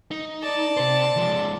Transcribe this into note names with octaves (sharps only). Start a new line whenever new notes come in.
D#4
D5 A5
C3 C5
F3 G#3